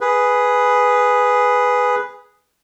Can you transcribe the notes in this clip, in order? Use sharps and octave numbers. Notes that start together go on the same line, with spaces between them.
G#4 B4